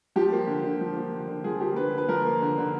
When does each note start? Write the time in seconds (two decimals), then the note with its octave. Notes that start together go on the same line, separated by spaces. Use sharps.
0.16 F3 G4
0.33 A#3
0.47 D3
0.64 D3
0.81 F3
0.96 A#3
1.12 D3
1.28 D3
1.44 F3 G#4
1.60 A#3 G4
1.76 D3 B4
1.94 D3 B4
2.09 F3 A#4
2.25 A#3
2.42 D3
2.58 D3